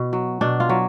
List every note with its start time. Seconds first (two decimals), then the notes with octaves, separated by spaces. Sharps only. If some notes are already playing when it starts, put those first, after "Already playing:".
Already playing: B2
0.13 F#3
0.41 B2 D4
0.60 F4
0.69 F#3